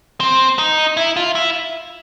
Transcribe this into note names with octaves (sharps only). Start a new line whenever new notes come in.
C4
D#4
E4
F4
E4